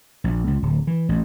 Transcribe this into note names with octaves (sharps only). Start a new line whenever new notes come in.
A#1
C#2
D1
E3
A1